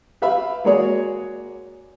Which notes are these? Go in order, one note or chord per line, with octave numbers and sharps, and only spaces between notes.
G4 B4 E5 F5 B5
G#3 A#3 F#4 G#4 C#5 D5